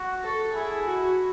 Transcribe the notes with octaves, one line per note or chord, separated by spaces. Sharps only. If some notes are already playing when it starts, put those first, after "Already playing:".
Already playing: F#4
A4
E4 G#4
F#4